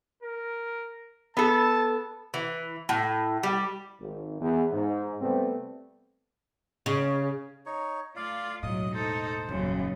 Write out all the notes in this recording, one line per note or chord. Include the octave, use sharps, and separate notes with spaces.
A#4
B3 A4 A5
E3
A2
G3
G#1
E2
G#2
C3 G3 A3 B3 C4
C#3
D#4 C#5
A3 F4 D5 F5
E1 A2 F#3 D#5 D#6
D#4 A4 C5
D#1 F#2 C#3